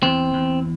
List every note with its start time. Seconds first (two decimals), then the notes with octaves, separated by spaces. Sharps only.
0.03 E2 C4
0.34 E2